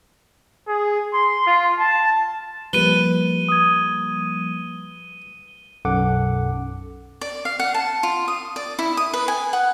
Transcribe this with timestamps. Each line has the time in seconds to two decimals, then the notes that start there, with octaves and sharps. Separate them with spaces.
0.68 G#4
1.13 C6
1.47 F4
1.79 A5
2.73 F3 G3 A#3 B4 D#7 G7
3.49 D#6 G#6
5.85 B1 F#2 A4 F#5 D6
7.21 D5
7.45 F5
7.59 F#5
7.74 A5
8.03 F4
8.28 D#6
8.56 D5
8.79 E4
8.97 D#6
9.13 B4
9.28 G#5
9.53 F#5